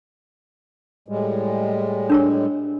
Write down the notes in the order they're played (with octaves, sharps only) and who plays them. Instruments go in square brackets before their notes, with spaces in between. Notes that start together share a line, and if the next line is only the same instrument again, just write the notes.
[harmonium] A2 G3 G#3
[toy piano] D4 A#4 C#5